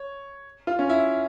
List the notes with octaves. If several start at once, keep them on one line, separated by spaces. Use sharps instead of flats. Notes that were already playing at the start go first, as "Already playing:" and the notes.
Already playing: C#5
F4
C#4
E4